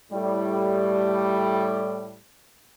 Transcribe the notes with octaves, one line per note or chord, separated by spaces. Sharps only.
A2 G3